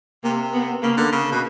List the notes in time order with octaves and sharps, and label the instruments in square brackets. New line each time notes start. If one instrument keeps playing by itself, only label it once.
[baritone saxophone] C3 [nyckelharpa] A#3
[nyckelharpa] B3
[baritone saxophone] C#3 [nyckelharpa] A#3
[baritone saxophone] D3
C#3
B2